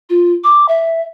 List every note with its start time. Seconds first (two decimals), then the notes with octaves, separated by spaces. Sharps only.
0.10 F4
0.44 D6
0.69 E5